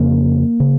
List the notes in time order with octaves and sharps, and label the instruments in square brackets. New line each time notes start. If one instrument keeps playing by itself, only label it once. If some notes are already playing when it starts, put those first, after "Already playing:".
Already playing: [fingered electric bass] F2 C#3 A#3
C#3